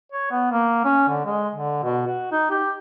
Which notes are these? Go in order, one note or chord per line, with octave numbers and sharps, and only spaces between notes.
C#5
B3
A#3
C#4
D3
G#3
D3
B2
F#4
D#4
G4